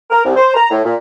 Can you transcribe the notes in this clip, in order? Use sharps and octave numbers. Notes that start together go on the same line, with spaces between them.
A#4
C2
C5
A#5
A2
A#2